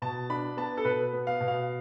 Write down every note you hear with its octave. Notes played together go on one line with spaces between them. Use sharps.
B2 A5
D4 B5
B3 A5
A4
B2 B4
B3
F5
B2
F5